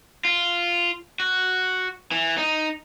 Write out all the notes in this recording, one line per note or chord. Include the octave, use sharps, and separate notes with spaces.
F4
F#4
E3
D#4